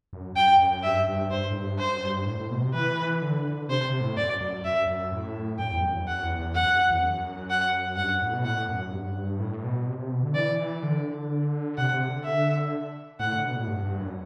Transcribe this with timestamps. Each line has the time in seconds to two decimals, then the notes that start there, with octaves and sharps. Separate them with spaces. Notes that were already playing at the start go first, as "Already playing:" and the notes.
0.13 F#2
0.36 F#2 G5
0.60 F#2
0.83 G2 E5
1.08 G2
1.31 G2 C5
1.50 A2
1.55 G2
1.79 F#2 C5
2.03 G2
2.26 A2
2.39 A2
2.51 B2
2.62 C3
2.74 E3 B4
3.22 D3
3.45 D3
3.69 C3 C5
3.85 C3
4.01 A2
4.16 F#2 D5
4.41 F#2
4.64 F#2 E5
4.87 F#2
5.11 A2
5.59 F#2 G5
5.71 E2
5.82 F#2
5.94 E2
6.07 F#2 F#5
6.23 E2
6.39 E2
6.55 F#2 F#5
6.66 F#2
6.90 E2
7.02 F#2
7.50 F#5
7.96 G2 F#5
8.09 F#2
8.21 A2
8.33 B2
8.45 A2 F#5
8.69 F#2
8.92 G2
9.40 A2
9.64 B2
9.87 C3
9.99 C3
10.12 B2
10.23 D3
10.35 E3 D5
10.59 E3
10.83 D3
11.77 C3 F#5
11.94 C3
12.09 D3
12.24 E5
13.20 A2 F#5
13.32 D3
13.44 B2
13.56 A2
13.67 G2
13.84 G2
14.00 F#2